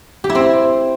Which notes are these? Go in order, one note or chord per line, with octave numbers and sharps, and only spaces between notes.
G4
E4
C4